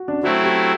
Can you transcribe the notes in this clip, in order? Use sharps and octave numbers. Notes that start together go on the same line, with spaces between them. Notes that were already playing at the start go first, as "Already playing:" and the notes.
Already playing: F#4
D4
F#3 A3 C4 E4 F#4
G4